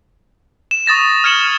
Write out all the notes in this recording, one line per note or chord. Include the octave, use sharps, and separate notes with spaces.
E7
C#6 D#6 A6 A#6 E7
F6 G#6 C#7 E7 F#7